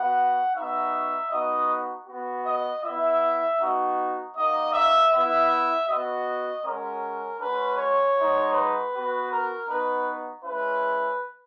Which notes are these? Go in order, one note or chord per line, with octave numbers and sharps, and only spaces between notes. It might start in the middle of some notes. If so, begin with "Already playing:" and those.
Already playing: B3 F#4 F#5
B3 D#4 F#4 E5
B3 D#4 F#4 D#5
B3 F#4
D#5
B3 E4 E5
B3 D#4 F#4
A#3 D#4 F#4 D#5
E5
B3 E4 E5
B3 F#4 D#5
G#3 C#4 F#4 A#4
G#3 C#4 F#4 B4
C#5
G#3 D#4 F#4
B4
B3 F#4
A#4
B3 D#4 F#4 B4
G#3 C#4 E4 B4